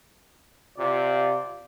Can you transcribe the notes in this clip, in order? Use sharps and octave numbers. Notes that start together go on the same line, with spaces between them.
C3 F4 D5